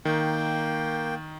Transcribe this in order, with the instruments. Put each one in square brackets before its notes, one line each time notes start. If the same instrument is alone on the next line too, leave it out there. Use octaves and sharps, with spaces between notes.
[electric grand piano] D#3 [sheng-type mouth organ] A#3 G5